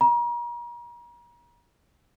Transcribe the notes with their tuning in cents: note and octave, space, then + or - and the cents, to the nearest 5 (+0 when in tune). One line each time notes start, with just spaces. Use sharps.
A#5 +40